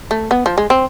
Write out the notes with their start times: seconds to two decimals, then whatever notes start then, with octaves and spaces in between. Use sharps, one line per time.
0.11 A3
0.31 B3
0.46 F3
0.58 G#3
0.70 C4